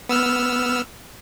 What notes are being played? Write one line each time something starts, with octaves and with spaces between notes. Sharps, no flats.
B3 E6 F6